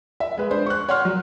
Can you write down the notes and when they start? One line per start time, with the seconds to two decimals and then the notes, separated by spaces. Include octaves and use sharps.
0.20 E5
0.37 G#3 B4
0.51 D4 C5
0.66 C#6 F#6
0.89 C#5 F#5 C6 F6
1.05 F#3